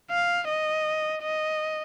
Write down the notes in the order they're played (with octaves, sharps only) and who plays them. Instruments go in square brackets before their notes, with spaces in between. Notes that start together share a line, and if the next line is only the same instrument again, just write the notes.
[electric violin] F5
D#5
D#5